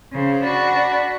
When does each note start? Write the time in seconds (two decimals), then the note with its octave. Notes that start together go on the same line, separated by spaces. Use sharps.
0.12 C#3 C5
0.41 D4 F#4 B5